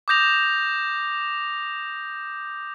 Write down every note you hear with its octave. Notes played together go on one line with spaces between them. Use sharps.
D6 D#6 G6 A#6 F7